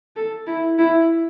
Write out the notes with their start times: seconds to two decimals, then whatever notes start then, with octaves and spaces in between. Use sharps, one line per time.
0.16 A4
0.46 E4
0.78 E4